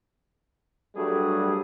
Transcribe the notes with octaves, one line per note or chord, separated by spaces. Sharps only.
G2 F#3 G3 A3 G#4